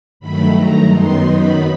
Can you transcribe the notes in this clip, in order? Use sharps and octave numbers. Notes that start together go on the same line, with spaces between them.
G2 D#3 F#3 A3 B5
A#5
F#2 D#3 F#3 B3 D#4 C6
B5